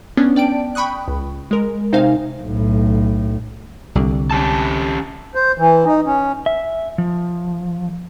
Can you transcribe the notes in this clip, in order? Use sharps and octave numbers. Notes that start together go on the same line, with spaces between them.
B3 C#4 D4
D5 G5 A5 D7
G5 B5 C#6 D#6 F#6
C#2
G#3 A#4
C3 D#4 C5 F5 G#5
B1 A2
C2 D3
C#4 G4 A5
C5
E3
D#4
C#4
E5
F3